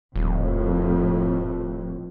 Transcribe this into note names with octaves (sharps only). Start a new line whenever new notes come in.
D#1 F2 A2